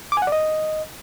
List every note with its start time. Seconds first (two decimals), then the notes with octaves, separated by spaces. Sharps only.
0.12 D6
0.17 G#5
0.22 F#5
0.27 D5
0.32 D#5